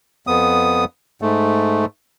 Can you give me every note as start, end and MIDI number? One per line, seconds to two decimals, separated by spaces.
0.27 0.85 41
0.27 0.85 59
0.27 0.85 87
1.22 1.85 44
1.22 1.85 57